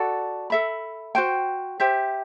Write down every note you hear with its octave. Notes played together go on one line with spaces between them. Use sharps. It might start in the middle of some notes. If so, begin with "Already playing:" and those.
Already playing: F#4 A4 D5 F#5
A4 E5 B5
F#4 C5 G5
G4 C5 E5